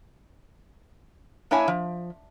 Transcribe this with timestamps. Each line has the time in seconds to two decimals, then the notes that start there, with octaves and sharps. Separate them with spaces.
1.51 A#3 D4 E4 C#5 G#5
1.68 F3